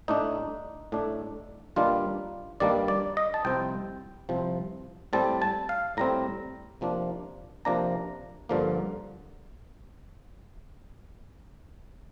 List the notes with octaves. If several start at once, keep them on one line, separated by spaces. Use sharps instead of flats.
A2 A3 D4 D#4
A2 A3 D4
G2 D#3 G3 A#3 D4 F4
G2 D#3 G3 A#3 D4 D5
D5
D#5
A5
C2 C3 F3 C4 G5
C2 C3 F3 C4
A2 G3 C4 A5
A5
F5
A2 G3 C4 A#5
C3 F3 A#3 D4
C3 F3 A#3 D4 A#5
G2 D3 F3 A#3